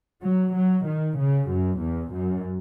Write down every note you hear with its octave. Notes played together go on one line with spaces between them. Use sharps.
F#3
F#3
D#3
C#3
F#2
E2
F#2